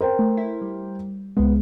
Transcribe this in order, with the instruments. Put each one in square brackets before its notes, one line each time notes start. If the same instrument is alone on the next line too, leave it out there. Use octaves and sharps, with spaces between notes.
[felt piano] A#4 C5 G5
[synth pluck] A3
E4
G3
[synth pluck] C#2 G#3 [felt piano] B3